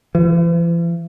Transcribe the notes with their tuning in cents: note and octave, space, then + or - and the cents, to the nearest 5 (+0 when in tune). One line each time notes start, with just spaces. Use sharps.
E3 +45